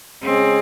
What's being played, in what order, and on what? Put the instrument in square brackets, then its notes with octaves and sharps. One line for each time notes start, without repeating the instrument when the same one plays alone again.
[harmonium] C#3 G#3 C#4 G#4 [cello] C4